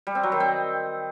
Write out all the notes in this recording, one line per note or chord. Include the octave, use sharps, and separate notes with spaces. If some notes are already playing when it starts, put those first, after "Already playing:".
G3
C4
F#3
D#3
C4